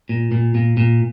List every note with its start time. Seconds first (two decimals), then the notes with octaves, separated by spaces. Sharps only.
0.09 A#2
0.32 A#2
0.55 A#2
0.77 A#2